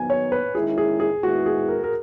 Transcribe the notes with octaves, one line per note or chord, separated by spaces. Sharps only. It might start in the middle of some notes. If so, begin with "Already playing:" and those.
Already playing: D#3 F#3 B3 G#5
C#5
B4
D#3 G#3 C#4 E4 G#4
G#4
G#4
D#3 G#3 B3 E4 F#4
G#4
A#4
A#4